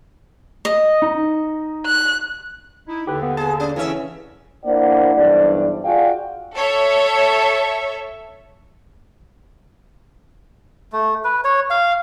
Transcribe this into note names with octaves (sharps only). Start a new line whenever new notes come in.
D#5
D#4
F#6
D#4 E4
D#2 D3 G4 B4
B3
G#4 A5
C#4
C#3 E3 C#4 E5
A#3 D4 E4 C5 D5 F#5
B1 G2 E3 C5 D5
F4 F#4 G#4 D5 F5 G5
A4 C#5 E5
A3
B4
C#5
F5